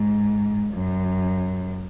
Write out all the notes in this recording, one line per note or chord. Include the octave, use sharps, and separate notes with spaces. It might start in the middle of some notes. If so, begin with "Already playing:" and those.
Already playing: G#2
F#2